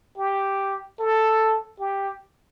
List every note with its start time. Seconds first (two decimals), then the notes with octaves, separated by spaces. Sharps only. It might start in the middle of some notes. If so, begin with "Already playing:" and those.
0.18 G4
0.99 A4
1.80 G4